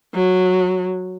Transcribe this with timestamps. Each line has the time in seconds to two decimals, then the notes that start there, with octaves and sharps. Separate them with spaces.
0.15 F#3